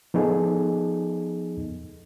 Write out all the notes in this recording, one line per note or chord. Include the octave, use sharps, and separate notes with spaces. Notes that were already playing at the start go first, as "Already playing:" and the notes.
F3 B3 D#4 G#4 A4 D#5